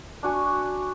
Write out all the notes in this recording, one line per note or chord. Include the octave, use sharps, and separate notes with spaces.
D4 F#4 G#5